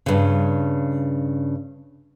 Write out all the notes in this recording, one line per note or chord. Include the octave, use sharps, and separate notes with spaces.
G2 C#3